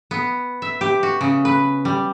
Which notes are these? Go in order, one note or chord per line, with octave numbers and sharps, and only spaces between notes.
B3
E5
G4
F#4
C#3
B4
G3